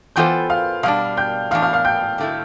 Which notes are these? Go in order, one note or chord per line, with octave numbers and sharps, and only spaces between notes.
E3 B3 F4 A4 C5 G5 G6
F5 F6
B2 G3 D4 F5 F6
G5 G6
A2 E3 B3 D4 F5 F6
F5 F6
F5 F6
G5 G6
D3 A3 E4